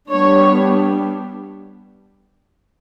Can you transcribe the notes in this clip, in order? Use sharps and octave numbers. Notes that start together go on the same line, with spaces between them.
G3 B3 D4 C#5